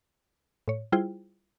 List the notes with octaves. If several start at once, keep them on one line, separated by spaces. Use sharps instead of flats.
A2 C#5
G3 E4 F4 G#4 C5 G5